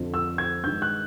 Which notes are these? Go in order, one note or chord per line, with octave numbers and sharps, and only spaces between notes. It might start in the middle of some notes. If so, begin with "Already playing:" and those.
Already playing: F2 D3 F3
E6
G#6
G2 D#3 G#3 G6
F#6